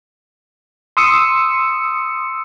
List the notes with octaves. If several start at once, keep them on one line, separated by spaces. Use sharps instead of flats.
C6 D#6 E6 C#7